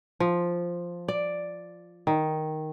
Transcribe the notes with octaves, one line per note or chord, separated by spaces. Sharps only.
F3
D5
D#3